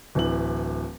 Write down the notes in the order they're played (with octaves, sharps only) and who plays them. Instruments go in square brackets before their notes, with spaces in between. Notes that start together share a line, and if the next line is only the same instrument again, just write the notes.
[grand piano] D1 E3 F#7